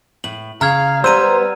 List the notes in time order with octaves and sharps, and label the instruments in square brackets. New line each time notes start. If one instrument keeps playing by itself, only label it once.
[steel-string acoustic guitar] A2 [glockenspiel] F#7
[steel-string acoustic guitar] C#3 [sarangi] F5 [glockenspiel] A#5 F6 G#6
[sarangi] G3 [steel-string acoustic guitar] B3 B4 A#5 [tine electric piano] C5 [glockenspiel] E6 D#7